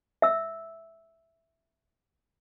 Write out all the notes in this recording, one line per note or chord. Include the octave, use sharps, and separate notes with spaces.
E5 E6